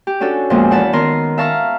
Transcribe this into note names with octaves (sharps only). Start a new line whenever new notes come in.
G4
C#4 D4 F#4 A4
F2 A#2 F3 G#3 B3
E2 F#5 A5 B5
D#3 B3 A#4 C6
E5 F5 A5 A#5 C#6 F6